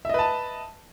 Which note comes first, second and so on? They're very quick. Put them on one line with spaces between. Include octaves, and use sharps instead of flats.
E5 D#5 B4 A5